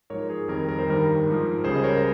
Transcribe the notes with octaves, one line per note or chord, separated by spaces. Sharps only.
G#2 F3 A#4 C#5
G#4
F2 D#3 G3 A#4
A#4
C5
G2 D#3 G3 A#4
G#2 F3
C#2 C#3 G3 G#4 C5
D#5
A#4 C#5